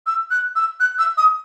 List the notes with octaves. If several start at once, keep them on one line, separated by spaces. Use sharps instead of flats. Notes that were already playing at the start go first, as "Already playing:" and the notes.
E6
F#6
E6
F#6
E6
D#6